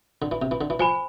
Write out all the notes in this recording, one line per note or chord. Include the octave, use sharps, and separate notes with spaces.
D3
E3
C3
E3
D3
E3
F3 C5 G#5 B5